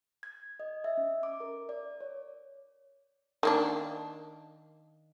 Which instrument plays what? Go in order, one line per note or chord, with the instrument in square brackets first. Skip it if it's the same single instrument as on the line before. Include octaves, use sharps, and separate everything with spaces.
[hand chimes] G#6
D#5
E5
C#4
D6
A#4
D5
C#5
[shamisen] D#3 A#3 D4